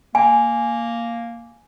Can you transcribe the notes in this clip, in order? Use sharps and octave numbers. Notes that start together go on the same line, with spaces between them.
A#3 G#5